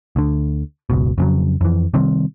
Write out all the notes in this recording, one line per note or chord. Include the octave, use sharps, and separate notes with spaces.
D2 D3
F#1 C#2 B2
F2 C#3 F#3
F2 E3
C3 D#3 G3 C4